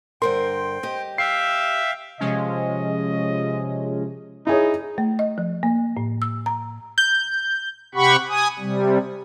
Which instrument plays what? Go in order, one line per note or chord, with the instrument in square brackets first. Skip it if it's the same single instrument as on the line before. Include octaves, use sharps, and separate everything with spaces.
[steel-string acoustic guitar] G2 D3 A#4 [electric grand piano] C5 C6 [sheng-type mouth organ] G5
[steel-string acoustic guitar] G4 D#5
[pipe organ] E5 [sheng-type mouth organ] F5 G5 [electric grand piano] C7
[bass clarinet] C3 [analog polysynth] F3 G#3 C#4 [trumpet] D#5
[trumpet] D#4 [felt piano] E4 G#4 C#5
[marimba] A3
D#5
F3
A#3
A2
E6
A#5
[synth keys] G6
[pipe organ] C3 G4 F#5 B5 C#6
G#5 D#6
C3 G3